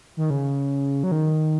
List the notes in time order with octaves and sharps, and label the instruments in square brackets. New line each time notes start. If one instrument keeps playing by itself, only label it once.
[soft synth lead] D#3
C#3
F#3
D#3